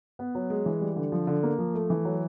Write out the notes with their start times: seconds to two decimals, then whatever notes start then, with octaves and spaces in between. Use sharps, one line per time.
0.19 B3
0.35 F#3
0.50 G#3
0.66 E3
0.81 G3
0.96 D3
1.12 F3
1.27 D3
1.43 A#3
1.59 F3
1.74 A3
1.90 E3
2.05 F#3